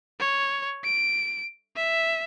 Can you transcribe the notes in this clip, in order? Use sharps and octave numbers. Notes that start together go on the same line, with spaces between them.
C#5
D7
E5